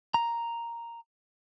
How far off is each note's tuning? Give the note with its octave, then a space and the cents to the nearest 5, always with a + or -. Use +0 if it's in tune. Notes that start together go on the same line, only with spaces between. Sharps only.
A#5 +0